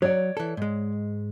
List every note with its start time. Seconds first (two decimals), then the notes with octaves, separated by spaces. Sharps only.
0.02 F#3 C#5 D5
0.37 E3 A4
0.57 G#2 G#3